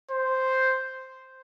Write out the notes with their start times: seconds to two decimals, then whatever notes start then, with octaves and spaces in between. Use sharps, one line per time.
0.11 C5